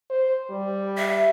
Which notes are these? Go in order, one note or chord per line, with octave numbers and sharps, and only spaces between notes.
C5
G3
E5